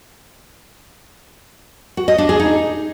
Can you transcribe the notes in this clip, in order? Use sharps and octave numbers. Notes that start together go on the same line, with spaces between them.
F#4
D#5
D4
G#4
D#4